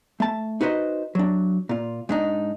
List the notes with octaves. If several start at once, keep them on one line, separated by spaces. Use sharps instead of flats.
A3 A5
D#4 F#4 B4 C5 D#5
F#3 D4
A#2 F4
G#2 D4 D#4